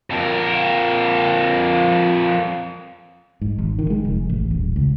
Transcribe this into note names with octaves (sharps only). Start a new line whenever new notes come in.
F2 A#4
G#2
G#1
D#3
G#3
F1
A1
D#1
C#2